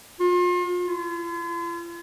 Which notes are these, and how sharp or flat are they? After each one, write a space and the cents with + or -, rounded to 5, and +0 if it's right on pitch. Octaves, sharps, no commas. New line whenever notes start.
F4 +35
F4 -45